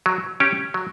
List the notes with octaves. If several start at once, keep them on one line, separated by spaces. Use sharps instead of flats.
F#3
C#4 G4
F#3